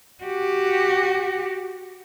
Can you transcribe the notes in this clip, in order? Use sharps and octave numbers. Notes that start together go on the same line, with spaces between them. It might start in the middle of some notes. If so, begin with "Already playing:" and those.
F#4 G4